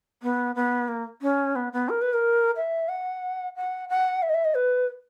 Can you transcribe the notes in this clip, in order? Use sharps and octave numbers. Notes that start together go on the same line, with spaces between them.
B3
B3
A#3
C#4
B3
B3
A#4
B4
A#4
E5
F#5
F#5
F#5
E5
D#5
E5
D#5
B4